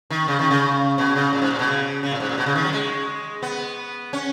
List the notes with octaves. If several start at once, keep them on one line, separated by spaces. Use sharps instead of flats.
D#3
C#3
D#3
C#3
B2
C#3
A#2
G#2
A#2
B2
C#3
C#3
A#2
G#2
A#2
B2
C#3
D#3
F#3
G#3
B3
C#4